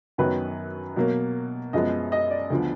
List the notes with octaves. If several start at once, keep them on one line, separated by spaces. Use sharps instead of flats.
F#2 D#3 F#3 B3 B4
B2 F#3 A#3
F#2 F3 G#3 B3 D#5
D#5
D5
D2 D3 F3 B3